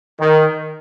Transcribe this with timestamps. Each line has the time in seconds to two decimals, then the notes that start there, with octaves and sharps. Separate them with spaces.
0.20 D#3